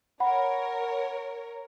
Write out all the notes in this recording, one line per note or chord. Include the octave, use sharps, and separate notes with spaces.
A#4 C#5 F#5 B5